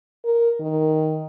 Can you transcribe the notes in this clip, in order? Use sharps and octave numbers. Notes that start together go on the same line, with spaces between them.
A#4
D#3